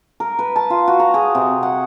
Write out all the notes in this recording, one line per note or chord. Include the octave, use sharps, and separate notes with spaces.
A#4
B4
A5
F4
F#4
A#5
G#4
C3
F#5